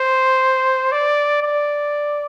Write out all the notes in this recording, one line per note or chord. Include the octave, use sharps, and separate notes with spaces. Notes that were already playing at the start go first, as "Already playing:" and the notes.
Already playing: C5
D5
D5